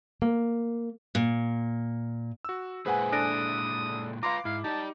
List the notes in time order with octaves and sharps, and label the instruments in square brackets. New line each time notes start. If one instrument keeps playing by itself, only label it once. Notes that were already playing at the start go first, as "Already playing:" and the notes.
[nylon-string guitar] A#3
[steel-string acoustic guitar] A#2
[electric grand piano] F#4 E6
[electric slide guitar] A#2 G#3 E4 [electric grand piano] G#4 B4 F#5 [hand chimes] C5 G#5
[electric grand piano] D4 A4 [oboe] D#6 [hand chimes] F#6 A#6 D7
[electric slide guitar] F4 B4 [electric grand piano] F5 C6 D6 [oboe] A#5
[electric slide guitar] G#2 [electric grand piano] E4 [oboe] F5
[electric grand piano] D#4 [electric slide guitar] G4 D5 [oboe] A5